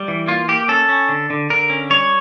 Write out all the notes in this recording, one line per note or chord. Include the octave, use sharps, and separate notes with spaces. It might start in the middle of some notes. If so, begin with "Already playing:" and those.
Already playing: G3
E3
A#3 F4
A#3 G4
C#4 A4
C#4
D3
D3
D3 A#4
C#4
G3 C#5